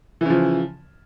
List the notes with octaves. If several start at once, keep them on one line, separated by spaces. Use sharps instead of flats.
C#3 E3 F3